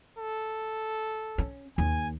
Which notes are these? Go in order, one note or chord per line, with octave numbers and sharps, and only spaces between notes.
A4
C#4
D#2 G#5